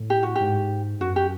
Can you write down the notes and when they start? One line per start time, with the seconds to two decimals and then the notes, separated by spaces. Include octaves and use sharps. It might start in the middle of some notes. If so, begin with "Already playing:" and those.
Already playing: A2
0.10 G4
0.23 F#4
0.35 G#2 G4
1.00 F#2 F#4
1.16 G4